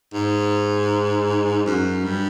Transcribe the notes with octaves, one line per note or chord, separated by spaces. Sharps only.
G#2
F#2
G2